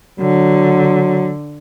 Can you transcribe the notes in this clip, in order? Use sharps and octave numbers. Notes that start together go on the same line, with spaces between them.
D3 F#3